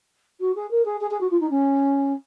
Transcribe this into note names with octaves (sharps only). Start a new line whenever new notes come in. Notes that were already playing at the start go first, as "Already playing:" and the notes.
F#4
G#4
A#4
G#4
G#4
G#4
F#4
F4
D#4
C#4